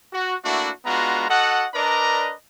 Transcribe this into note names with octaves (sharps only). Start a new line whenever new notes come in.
F#4
A3 A#3 D4 E4 F#4
G#3 B3 D4 F4 F#4 A#5
F#4 A4 D#5 F#5
D4 A#4 B4 D5 D#5 A#5